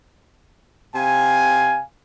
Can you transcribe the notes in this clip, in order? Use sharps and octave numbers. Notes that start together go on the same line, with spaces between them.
C3 F5 G#5